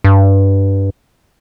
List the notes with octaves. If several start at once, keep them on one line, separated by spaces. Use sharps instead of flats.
G2